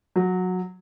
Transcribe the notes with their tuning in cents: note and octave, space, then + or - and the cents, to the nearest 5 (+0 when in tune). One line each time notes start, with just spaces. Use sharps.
F#3 -15